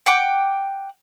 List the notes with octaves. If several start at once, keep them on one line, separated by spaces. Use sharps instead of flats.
F#5 G5 D6